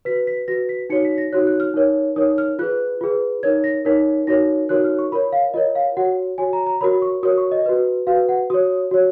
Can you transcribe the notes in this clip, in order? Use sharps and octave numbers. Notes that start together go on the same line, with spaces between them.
F#4 B4 B6
B6
F#4 B4 A#6
B6
D#4 F#4 C#5 C#7
B6
A#6
D#4 F#4 C#5 F#6
F#6
F6
D#4 A#4 C#5
D#4 A#4 C#5 D#6
F6
F4 G#4 B4 F#6
F4 G#4 B4
D#4 A#4 C#5 G#6
A#6
D#4 A#4 C#5 B6
D#4 F#4 A#4 C#5 A#6
D#4 F#4 A#4 C#5 F#6
F6
C#6
F4 A#4 C#5 B5
F5
F4 A#4 C#5 D#5
F5
F#4 C#5 F#5
F#4 C#5 G#5
A#5
A#5
F#4 A#4 C#5 B5
C#6
F#4 A#4 C#5 D#6
C#6
D#5
F#4 B4
F#4 B4 F5
F#5
F#4 C#5 D#6
F#4 C#5